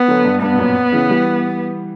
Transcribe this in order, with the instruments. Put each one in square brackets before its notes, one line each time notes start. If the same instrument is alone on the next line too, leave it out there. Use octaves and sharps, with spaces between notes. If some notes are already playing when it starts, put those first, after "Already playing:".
Already playing: [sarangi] B3
[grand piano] D3 F#3
G2
[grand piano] G2 [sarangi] B3
[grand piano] B2
F#2 A#2
C#3 E3
E3 G3